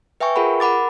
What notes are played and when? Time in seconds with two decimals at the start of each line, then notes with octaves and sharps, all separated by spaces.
0.20 B4 E5 G5 G#5 C#6
0.36 F4 G#4 A#4 F#5 B5
0.60 A#4 F#5 B5 D6 A6